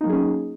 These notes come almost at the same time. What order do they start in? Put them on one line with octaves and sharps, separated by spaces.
D#4 A#3 F#3 G#4 C#4